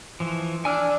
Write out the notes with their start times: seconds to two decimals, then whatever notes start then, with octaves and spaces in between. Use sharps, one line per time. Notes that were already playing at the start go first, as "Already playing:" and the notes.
0.20 E3 F3
0.65 D4 G#5 E6 F6